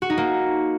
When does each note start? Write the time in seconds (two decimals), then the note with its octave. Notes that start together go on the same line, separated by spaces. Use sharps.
0.02 F#4
0.10 D#4
0.18 A#3